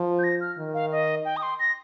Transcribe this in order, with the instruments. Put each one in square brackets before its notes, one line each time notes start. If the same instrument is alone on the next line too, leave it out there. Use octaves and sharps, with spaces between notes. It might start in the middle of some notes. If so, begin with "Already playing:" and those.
Already playing: [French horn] F3
[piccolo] G6
A#6
F6
[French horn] D#3
[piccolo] F5
D#5
G5
D#6
C6
A#6